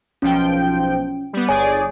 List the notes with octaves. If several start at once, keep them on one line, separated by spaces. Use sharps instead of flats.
B1 F3 C#4 G5
G3 B3
G1 G#4 C#5 D5 G#5